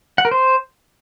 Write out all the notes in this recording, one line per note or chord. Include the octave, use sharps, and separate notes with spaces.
F#5
A#4
C5